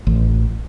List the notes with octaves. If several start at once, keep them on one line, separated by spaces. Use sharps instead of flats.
A1